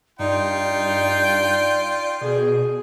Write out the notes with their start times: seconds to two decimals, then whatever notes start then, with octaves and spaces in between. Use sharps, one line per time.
0.19 G2 D#4 F4 D5 G5
2.21 B2 G#4